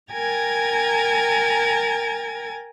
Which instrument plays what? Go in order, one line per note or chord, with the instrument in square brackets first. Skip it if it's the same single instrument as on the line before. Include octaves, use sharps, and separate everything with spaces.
[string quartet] A#4 G5 G#5 A#5 G#6 A6